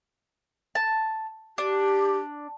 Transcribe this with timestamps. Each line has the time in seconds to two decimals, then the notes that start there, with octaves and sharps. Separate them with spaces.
0.75 A5
1.58 D4 G4